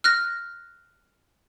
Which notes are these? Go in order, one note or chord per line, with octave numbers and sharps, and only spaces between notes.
F6 F#6 A#6